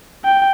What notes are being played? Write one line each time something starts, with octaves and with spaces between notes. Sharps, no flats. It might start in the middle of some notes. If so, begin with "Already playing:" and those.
G5